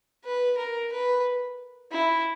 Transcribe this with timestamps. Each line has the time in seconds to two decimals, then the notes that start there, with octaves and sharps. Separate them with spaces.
0.24 B4
0.58 A#4
0.92 B4
1.91 E4